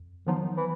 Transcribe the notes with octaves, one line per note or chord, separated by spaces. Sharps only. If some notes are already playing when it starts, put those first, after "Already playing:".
Already playing: F2
D#3 F3 F#3 B3 D#4
E3